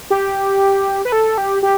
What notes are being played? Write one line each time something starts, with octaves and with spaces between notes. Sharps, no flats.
G4
B4
A4
G4
G4